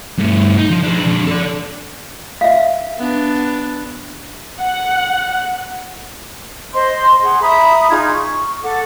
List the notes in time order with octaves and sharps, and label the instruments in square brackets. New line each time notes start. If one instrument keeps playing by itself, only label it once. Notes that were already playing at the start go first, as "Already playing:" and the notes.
[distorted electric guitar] G2 A3
D#4
F3
G#3 D4
F2 D4
A4 D5
[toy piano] E5 F5
[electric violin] B3 D4
[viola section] F#5
[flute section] C5 D#5 C6
G#4 F#5 C6
E5 A#5 B5 D#6
D#4 F4 G#4 G#6
C#6
A4 F#5 D6